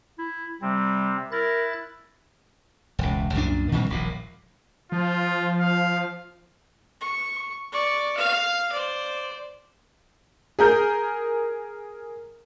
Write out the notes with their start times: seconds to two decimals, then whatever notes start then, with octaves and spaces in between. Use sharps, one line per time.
0.18 E4
0.62 C3 G3 C4
1.32 E4 A#4 F#6 A6
2.99 E1 C#2
3.34 C2 F#2 A#2 D4
3.72 A#2 D#3 G3 C4
3.89 D#1 A#1 A#2
4.92 F3 F4
5.60 F5
7.01 C#6
7.72 D5 C#6
8.17 F5
8.72 C5 D5
10.59 G#4 A#4 G6